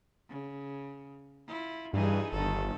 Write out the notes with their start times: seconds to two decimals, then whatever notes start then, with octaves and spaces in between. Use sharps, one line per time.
0.29 C#3
1.48 E4 F4
1.93 G2 E3 D#4 G#4
2.33 G1 G2 D#3 A4